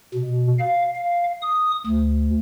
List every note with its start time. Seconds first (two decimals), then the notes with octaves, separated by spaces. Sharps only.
0.14 B2
0.59 F5
0.95 F5
1.42 D#6
1.87 D2